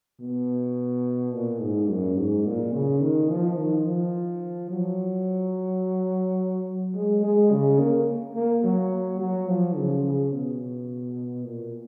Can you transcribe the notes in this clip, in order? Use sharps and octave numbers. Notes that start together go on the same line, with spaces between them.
B2
A#2
G#2
F#2
G#2
A#2
C#3
D#3
F3
D#3
F3
F#3
G#3
G#3
C#3
A#3
A#3
F#3
F#3
F3
C#3
C#3
B2
A#2